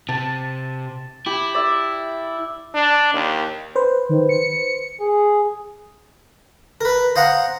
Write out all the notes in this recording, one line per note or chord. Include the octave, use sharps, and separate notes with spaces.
C3 A5
E4 G4
D5 E5
D4
D#2
B4 C5
D#3
C#7
G#4
A#4 B4
C5 D#5 F5 F#5 A#5